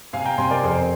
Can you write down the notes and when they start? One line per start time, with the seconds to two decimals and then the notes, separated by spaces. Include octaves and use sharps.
0.13 C3 F5 G#5
0.25 G5 A#5
0.38 C3 G#5 C6
0.50 A#4 D5
0.63 F2 G#4 C5